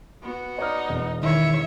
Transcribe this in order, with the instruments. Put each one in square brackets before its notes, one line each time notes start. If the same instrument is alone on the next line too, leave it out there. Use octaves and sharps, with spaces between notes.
[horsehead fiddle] B3 F#4
[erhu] D#4 [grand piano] C#5 D5 F6
[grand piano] E1 E2
[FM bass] D#3 [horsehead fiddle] E4 C#5 [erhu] E5